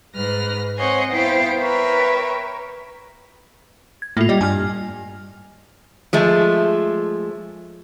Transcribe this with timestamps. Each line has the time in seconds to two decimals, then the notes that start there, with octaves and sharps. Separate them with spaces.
0.14 G#2 B4 F6 A#6
0.76 C4 C5 C#5 D#5 F#5 G#5
1.11 B3 E4 C5 F5 G5
1.59 A#4 B4 C#5 E5 G5
4.02 G#6
4.17 A2 A#3 F4
4.29 G3 D#5
4.41 G2 G#5 F6
6.13 F3 G#3 A3